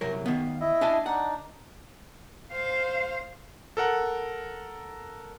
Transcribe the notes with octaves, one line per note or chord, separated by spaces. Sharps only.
C2 F#3 A#4
D#3 B3 F5
E4 D#5 E5
D4 G#5 A5
D4 D#4 F#5
C5 F5
A4 A#4 F#5